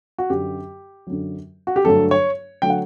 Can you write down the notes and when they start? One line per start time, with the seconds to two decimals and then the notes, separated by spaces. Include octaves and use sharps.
0.18 F#4
0.29 F#2 D3 F#3 G4
1.07 F#2 D3 F#3
1.67 F#4
1.76 G4
1.85 G2 D3 F#3 A3 A4
2.11 C#5
2.62 D3 F#3 A3 G5
2.70 F#5